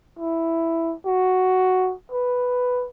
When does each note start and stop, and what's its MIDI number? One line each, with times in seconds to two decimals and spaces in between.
0.19 0.95 64
1.06 1.94 66
2.12 2.87 71